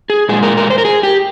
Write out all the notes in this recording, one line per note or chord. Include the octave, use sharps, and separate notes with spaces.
G#4
A#2 G#3 G#4
A#4
A#4
C5
A#4
G#4
G4